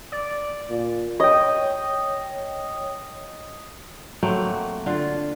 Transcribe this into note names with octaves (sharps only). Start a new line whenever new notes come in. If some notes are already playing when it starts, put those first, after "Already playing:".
D5
A#2
C#5 D#5 G5
F#3 A3 A#3 C4
D3 F4